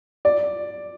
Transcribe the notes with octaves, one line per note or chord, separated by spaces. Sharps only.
D5